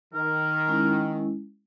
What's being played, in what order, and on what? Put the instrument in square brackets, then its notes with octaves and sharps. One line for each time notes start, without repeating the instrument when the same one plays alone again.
[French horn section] D#3 [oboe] A#4
[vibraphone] G#3 C#4 E4